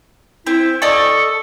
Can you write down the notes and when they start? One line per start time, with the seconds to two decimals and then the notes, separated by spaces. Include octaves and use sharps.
0.47 C4 E4
0.82 A4 D5 D#5 C#6